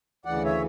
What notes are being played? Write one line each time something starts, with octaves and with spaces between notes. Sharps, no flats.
D2 C#3 E3 D5 F#5
C#5 E5